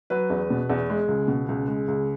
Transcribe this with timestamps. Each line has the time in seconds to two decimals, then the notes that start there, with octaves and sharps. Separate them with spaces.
0.10 F#3 B4
0.30 E2
0.50 B2
0.70 E2
0.90 G#3
1.08 C#2
1.28 B2
1.48 C#2
1.68 G#3
1.88 C#2